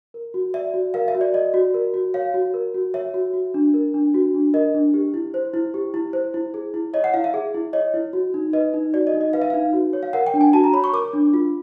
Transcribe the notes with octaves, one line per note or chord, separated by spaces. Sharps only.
A#4
F#4
D5 E5
F#4
A#4 F5
E5
F#4
D5
D5 D#5
F#4
A#4
F#4
C#5 F5
F#4
A#4
F#4
C#5 E5
F#4
F#4
D4
A#4
D4
F#4
D4
A#4 D#5
D4
G4
E4
C5
E4
G4
E4
C5
E4
G#4
E4
C#5 D#5
F#5
E4 F5
E5
G#4
E4
C#5 D#5
E4
F#4
D#4
B4 D#5
D#4
F#4 D5
D#5
D#4
D#5
B4 F5
E5
D#4 F5
F#4
C#5
F5
A#4 F#5
G5
D4
G#5
F#4 A5
A#5
C#5 B5
C#6
A#4 D6
D4
F4